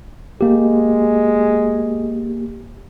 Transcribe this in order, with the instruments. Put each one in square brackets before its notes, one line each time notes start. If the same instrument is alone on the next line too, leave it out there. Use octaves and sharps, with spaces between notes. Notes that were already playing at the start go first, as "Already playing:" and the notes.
[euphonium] G#3 [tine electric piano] A#3 G4